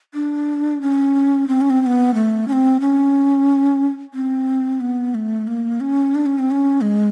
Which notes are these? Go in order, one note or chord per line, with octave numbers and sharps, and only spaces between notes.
D4
C#4
C4
C#4
C4
C4
B3
A3
C#4
C4
C#4
C4
B3
A3
A#3
C#4
D4
C#4
C4
C#4
G#3